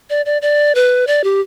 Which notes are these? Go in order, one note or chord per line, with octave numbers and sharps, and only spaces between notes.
D5
D5
D5
B4
D5
G4